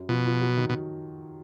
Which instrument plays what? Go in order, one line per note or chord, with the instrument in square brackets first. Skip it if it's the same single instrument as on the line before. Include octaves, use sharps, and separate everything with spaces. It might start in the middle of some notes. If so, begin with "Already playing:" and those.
Already playing: [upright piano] F#2
[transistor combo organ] B2 [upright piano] F3
[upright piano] F3
F#3
D#3
[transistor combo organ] B2